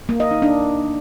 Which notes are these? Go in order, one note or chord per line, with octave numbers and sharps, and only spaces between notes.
A#3
D#5
D#4
D4